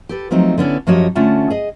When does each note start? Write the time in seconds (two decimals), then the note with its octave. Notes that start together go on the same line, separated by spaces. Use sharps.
0.09 G4 A4 B4
0.31 F3 F#3 A3 C4 D#4
0.58 D3 B3 C#4 E4
0.87 F#2 F3 F#4 G4 C#5 D#5
1.15 D3 A3 C#4 F4 F#5 A5
1.50 G#4 D#5